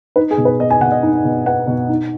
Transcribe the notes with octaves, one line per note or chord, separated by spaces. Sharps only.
D#4 B4
G#4
B2
B4
B3 D#5
G#5
B2 F#5
D#5
D#4
B2
B3 F#5
B2
D#4